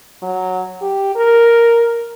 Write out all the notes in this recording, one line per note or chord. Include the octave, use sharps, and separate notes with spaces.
F#3
G4
A#4